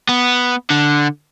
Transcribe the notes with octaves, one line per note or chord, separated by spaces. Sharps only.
B3
D3